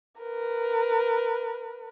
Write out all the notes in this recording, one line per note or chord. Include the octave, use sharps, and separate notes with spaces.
A#4 B4